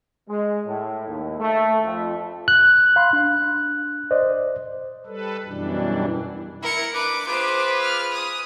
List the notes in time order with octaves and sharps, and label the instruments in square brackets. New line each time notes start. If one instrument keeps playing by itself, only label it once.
[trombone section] G#3
A2
D#2
A3
F2
[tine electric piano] F#6
[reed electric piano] F5 B5 C6
D4
C5 D5 D#5
[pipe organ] G3 A4 B4
F#2 B2 E3 G3 D4
[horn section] E4 [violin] A#4 C#7
[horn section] D4 B4 [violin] D6
[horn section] F4 G#4 B4 [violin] C5 D6
[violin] F6
D#6